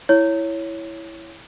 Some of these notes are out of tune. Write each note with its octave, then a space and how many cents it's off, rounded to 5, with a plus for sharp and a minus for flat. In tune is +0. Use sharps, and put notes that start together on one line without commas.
E4 +0 C#5 +0